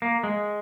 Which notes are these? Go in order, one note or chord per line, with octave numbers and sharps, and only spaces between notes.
A#3
G#3